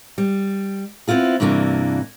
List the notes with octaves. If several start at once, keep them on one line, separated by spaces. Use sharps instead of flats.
G3
B3 C4 E4 F4 G#4
G2 C3 E3 A#3 C#4 D4